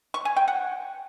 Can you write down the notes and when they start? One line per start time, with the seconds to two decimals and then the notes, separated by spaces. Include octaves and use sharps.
0.14 C#6
0.25 G#5
0.36 G5
0.48 F#5